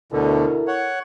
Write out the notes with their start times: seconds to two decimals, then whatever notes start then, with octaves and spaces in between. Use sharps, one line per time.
0.12 D2 B2 D3 E4 A4 A#4
0.68 C#5 F#5